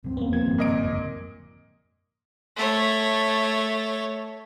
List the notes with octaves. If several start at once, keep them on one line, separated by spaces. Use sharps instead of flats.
F1 C2 F#2 C4
F1 E2 A#3 B3 C#4
F3 A#3 G#6
G2 D#3 G3
F#1 G2 A#2 D#5 D7
F2 G#2 D3
A3 C#5